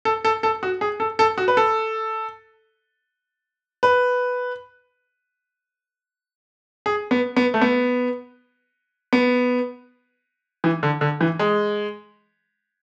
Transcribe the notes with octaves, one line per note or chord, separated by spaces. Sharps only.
A4
A4
A4
F#4
G#4
A4
A4
F#4
B4
A4
B4
G#4
B3
B3
A3
B3
B3
E3
D3
D3
E3
G#3